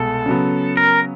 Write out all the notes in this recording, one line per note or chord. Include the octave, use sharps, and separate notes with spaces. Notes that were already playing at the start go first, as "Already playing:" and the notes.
Already playing: C2 B2 G#3 B3 A4
C#3 F#3 B3
A#4